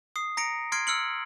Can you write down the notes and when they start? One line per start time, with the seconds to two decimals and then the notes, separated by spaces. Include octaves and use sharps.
0.16 D#6 C7
0.37 A#5 A#6 C#7 D7
0.72 C6 F6 G#6 C7 D7
0.87 E6 F6 C#7 F#7